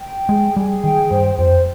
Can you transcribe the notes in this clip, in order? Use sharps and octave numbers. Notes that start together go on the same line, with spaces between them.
G5
G#3 G#4
G3 G#4
D#3 G5
G2 C5
F2 C5